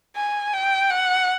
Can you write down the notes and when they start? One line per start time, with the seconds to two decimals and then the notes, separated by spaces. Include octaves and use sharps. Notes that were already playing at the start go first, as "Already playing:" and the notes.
0.16 G#5
0.53 G5
0.91 F#5